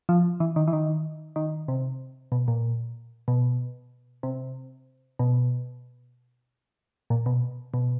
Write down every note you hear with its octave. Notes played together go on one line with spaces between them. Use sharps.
F3
E3
D#3
E3
D#3
D#3
C3
B2
A#2
B2
C3
B2
A#2
B2
B2